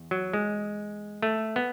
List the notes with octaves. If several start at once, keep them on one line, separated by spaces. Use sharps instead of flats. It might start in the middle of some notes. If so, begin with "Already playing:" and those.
Already playing: E2
F#3
G#3
A3
B3